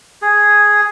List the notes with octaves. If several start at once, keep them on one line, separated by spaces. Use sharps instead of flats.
G#4